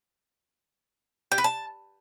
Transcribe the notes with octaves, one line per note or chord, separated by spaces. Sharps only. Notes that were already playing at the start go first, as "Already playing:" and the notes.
G4
B4
A5